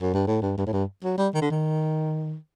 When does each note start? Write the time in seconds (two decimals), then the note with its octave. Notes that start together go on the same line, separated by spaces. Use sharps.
0.01 F#2
0.14 G2
0.27 A2
0.42 G2
0.57 G2
0.67 A2
0.73 G2
1.04 F#3
1.18 G3
1.34 D#3
1.41 D3
1.50 D#3